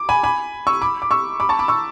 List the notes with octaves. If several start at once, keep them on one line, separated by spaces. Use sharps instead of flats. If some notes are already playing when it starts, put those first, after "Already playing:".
Already playing: D6
G#5 B5
G#5 B5
C#6 E6
B5 D6
D6
C#6 E6
B5 D6
A5 C#6
B5 D6
C#6 E6